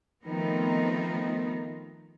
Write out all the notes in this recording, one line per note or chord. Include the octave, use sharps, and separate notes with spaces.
D#3 F3 A3 B3 C4 D#4